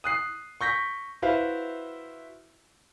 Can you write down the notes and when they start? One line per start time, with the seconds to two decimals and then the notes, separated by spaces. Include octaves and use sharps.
0.04 D#6 F#6 C7
0.61 C#6 G6 A#6 B6
1.22 E4 F#4 B4 C5 E5 F5